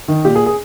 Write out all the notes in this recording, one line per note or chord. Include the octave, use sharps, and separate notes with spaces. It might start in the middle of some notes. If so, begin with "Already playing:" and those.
D#3
A#2 G4
G#4
G#4